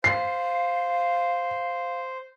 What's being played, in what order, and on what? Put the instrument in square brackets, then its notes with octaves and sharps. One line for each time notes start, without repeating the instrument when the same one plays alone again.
[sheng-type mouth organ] C5 [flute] F5 [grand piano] C7